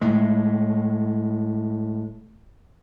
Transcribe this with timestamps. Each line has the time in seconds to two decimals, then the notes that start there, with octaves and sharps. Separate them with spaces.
0.01 A2 G#3